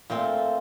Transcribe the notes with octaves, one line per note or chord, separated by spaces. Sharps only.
A#2 A3 C4 C5